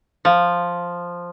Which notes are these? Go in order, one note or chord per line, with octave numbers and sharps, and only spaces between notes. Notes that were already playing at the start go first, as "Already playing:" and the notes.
F3